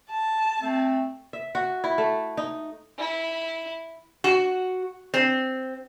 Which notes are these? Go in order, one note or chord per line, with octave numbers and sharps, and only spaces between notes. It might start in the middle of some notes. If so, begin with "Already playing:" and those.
A5
A3 C4
E5
F#4
E4
A3
D#4
E4
F#4
C4